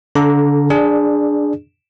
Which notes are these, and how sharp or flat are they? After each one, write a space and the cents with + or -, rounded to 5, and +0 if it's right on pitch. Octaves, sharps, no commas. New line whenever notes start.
D3 -30 A4 +0 A#5 +0
D4 +0 G#4 +0 D5 +20